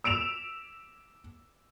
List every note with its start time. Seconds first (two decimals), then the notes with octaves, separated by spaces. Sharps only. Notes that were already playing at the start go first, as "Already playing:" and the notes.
0.04 E6 D7 E7 F7